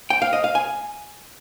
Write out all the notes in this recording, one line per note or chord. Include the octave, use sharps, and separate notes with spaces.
G5
F5
D#5
F5
G#5